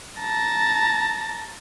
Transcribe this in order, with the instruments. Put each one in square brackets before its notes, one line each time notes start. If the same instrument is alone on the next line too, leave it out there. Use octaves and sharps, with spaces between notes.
[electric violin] A5 A#5